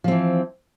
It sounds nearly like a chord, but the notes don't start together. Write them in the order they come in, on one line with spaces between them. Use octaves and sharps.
F3 C4 E3